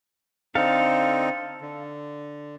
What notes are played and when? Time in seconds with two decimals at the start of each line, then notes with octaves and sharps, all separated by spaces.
0.55 D3 C4 D#4 A4 F5
1.61 D3